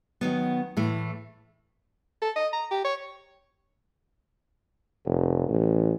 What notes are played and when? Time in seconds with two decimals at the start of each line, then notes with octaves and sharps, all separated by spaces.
0.21 D#3 F#3 B3
0.77 A2 E3 A3
2.22 A4
2.36 D#5
2.53 A#5
2.71 G4
2.84 C#5
5.06 F1
5.49 A1